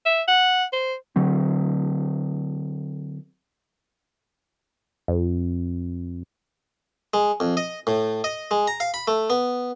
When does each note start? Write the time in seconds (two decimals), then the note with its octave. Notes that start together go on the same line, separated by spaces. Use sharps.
0.06 E5
0.28 F#5
0.73 C5
1.16 D3 F#3 C4
5.08 F2
7.14 G#3
7.40 F2
7.57 D#5
7.87 A2
8.24 D#5
8.51 G#3
8.67 A#5
8.80 F5
8.94 B5
9.08 A3
9.30 B3